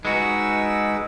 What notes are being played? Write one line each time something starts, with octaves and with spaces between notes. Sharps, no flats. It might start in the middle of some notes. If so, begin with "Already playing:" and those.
G#3 D#4 F#4 B4 E6